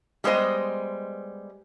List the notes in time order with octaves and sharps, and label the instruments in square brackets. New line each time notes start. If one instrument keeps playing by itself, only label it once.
[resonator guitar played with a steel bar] G3 G#3 B3 C5 D#5